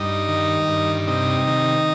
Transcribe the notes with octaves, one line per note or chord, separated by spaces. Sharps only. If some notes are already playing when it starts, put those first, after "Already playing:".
Already playing: G2 D#4
D#3
G2
C3 D#4
D#3